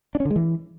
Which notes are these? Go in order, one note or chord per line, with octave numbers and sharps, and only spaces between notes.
D4
C#4
D3
G#3
E3